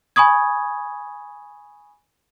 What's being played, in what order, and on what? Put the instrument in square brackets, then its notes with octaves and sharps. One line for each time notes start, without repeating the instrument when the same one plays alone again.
[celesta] G#5 B5 C#6 D#6 G#6